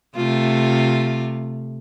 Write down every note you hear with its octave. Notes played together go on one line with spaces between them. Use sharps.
C3 A3 F4